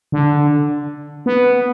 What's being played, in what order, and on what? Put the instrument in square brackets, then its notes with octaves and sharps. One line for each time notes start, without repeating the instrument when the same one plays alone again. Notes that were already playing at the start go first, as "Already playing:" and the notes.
[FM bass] D3
B3